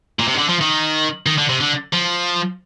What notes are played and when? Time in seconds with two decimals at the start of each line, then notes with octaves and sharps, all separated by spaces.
0.19 A#2
0.28 C3
0.34 D#3
0.38 D3
0.49 F3
0.61 D#3
1.26 D#3
1.38 D3
1.49 C3
1.61 D3
1.93 F3